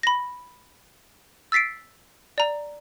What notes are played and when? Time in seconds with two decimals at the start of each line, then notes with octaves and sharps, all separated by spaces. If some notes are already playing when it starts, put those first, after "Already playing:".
0.03 B5 A#6
1.52 E6 A6 B6 C7 D7
2.38 D5 A#5